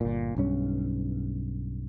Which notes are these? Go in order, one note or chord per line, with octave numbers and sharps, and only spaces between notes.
G1 A#2
B1 G2 C#4